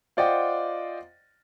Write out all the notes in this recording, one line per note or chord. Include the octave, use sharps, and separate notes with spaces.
F4 C5 D5 D#5 F#5 G5